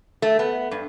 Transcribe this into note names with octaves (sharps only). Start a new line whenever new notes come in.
A3
B3
G2